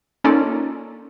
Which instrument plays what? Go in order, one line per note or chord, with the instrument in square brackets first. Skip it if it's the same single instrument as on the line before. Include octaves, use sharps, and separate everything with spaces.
[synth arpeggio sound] A#3 C#4 D#4 F4 A4 D5